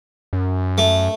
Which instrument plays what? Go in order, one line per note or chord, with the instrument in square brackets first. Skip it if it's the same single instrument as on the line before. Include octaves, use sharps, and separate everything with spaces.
[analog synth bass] F#2
[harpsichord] A3